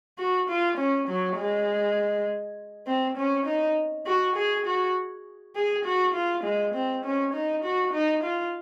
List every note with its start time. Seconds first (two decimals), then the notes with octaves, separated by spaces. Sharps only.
0.19 F#4
0.49 F4
0.78 C#4
1.09 F#3
1.37 G#3
2.87 C4
3.17 C#4
3.46 D#4
4.07 F#4
4.36 G#4
4.66 F#4
5.56 G#4
5.85 F#4
6.15 F4
6.44 G#3
6.74 C4
7.05 C#4
7.34 D#4
7.64 F#4
7.94 D#4
8.24 F4